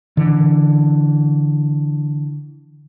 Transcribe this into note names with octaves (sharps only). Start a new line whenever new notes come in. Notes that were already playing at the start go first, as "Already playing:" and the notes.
D3 E3